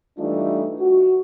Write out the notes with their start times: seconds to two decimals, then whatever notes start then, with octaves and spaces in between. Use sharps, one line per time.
0.18 E3 G3 A3 D4 D#4 F4
0.80 F#4